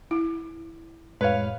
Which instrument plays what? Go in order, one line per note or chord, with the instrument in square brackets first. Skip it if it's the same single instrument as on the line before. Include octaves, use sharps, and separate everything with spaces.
[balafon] E4
[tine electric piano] F2 A2 G#3 [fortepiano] B4 C#5 F5